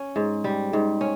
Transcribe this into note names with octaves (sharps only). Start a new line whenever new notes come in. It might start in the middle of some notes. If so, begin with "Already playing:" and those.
Already playing: C#4
G#2
G3
G#2
C#4